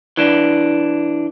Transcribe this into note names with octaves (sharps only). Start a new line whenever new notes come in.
E3 D4